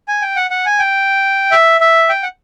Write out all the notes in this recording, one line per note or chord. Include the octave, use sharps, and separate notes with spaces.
G#5
G5
F#5
F#5
G#5
G5
E5
E5
G5
F#5